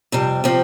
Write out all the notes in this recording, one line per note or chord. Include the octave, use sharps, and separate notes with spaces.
F2 C3 G3
C3 F3 C4